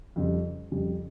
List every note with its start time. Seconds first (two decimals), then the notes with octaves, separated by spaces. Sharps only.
0.16 F2 C#3 G3
0.71 F2 C#3 G3